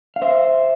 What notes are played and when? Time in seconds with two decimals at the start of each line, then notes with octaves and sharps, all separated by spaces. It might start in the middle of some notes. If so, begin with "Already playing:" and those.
0.16 F5
0.22 C5 E5